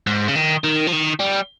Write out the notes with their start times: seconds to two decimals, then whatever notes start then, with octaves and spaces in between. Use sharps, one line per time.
0.07 G#2
0.28 C#3
0.36 D#3
0.64 D#3
0.87 F3
0.92 D#3
1.20 G3